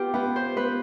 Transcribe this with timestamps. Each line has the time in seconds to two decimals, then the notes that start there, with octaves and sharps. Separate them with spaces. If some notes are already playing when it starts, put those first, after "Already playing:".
Already playing: B3 F4 G4
0.14 B3 B4
0.36 C5
0.57 B3 B4